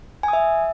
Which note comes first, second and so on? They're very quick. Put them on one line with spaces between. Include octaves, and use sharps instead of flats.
G#5 D#6 E5